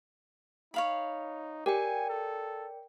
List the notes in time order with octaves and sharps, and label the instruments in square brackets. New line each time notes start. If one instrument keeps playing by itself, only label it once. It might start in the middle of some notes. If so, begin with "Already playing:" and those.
[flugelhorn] D#4 [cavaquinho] C#5 F5 B5
[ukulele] G4 [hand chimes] A#4 D5 G5 [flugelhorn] G#5
[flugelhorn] A4